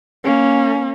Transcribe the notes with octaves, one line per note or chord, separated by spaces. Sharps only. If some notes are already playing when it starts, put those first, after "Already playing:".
A#3 C#4